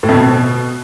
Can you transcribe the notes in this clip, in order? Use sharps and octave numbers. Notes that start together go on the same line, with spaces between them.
A2
F2
B2